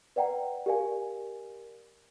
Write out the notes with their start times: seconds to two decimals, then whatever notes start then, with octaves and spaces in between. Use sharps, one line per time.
0.16 B4 D5 F#5 G5 A#5
0.66 G4 A#4 D5 F5 G#5